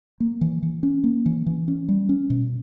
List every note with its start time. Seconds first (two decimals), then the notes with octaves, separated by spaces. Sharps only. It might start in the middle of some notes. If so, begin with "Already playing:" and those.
0.20 A#3
0.41 E3
0.63 E3
0.83 C#4
1.04 A#3
1.26 E3
1.46 E3
1.68 C#4
1.89 G3
2.09 C#4
2.30 B2